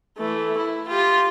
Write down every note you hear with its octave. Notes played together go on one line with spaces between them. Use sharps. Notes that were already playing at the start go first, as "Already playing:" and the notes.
E3 A3
E4
F4 G4